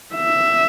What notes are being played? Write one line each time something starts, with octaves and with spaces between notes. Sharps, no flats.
E5